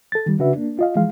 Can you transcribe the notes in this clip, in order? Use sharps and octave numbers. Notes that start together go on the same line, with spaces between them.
A4 A6
D#3 G3
C#3 D4 F#4 B4 E5
A#3 D4
F4 D#5 F5
E3 F3 G#3 F5